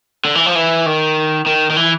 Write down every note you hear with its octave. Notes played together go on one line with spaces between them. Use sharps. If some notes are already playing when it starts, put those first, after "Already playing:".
D3
E3
F3
E3
D#3
D#3
D#3
E3